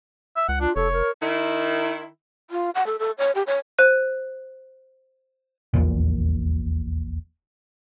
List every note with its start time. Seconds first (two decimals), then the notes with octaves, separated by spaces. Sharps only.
0.36 E5
0.49 C#2 F#5
0.61 D4 F4
0.76 F1 A4 C#5
0.93 A#4
1.21 D#3 E4
2.50 F4
2.75 F#5
2.86 A4
2.99 A4
3.18 C#5
3.35 G4
3.47 C#5
3.78 C5 F#6 D#7
5.74 D#1 A#1 E2 A#2